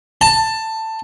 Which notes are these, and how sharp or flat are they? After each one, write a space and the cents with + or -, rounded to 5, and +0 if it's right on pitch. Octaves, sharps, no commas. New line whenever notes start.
A5 +15